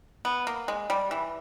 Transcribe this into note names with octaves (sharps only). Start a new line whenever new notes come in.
B3
A#3
G#3
G3
E3